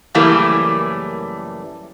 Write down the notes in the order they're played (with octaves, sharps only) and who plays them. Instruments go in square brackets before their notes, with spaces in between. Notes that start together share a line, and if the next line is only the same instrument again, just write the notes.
[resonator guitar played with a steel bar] F#2 C#3 E3 G3 A3 A#3